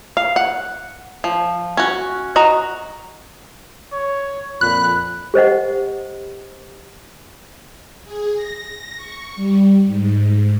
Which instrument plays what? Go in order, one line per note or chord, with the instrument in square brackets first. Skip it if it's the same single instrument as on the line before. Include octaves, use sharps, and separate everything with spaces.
[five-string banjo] F5
F#5
F3
C#4 F#4
F#4 D#5 A#5
[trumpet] C#5
[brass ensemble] F2 A#2 [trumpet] B5 [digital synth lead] F#6
[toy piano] G4 C5 D#5 F#5
[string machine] G#4
A#6
C#6
G3
G#2